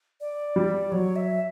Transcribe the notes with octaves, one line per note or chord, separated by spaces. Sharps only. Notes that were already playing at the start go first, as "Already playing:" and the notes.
D5
G3
F#3 C#5
E5